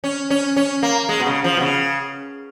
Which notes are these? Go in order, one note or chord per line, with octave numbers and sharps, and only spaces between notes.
C#4
C#4
C#4
A#3
G#3
B2
C#3
F3
B2
C#3